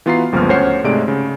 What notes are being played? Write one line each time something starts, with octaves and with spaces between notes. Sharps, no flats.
E3 B3 F4 F#4 A#5 C7
G1 C#2 F3 A#3 B3 F6
D2 C#4 C5 C#5 F#5 C7
G#2 C3 G#3 A3 D5 D7
C#3